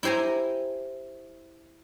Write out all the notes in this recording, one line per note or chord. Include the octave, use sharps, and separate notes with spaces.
E4 G4 C5 G#5 A#5